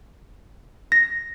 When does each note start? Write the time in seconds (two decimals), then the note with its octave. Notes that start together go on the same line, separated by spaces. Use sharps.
0.92 A#6